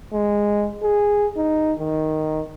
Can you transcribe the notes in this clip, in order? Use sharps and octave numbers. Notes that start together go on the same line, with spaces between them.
G#3
G#4
D#4
D#3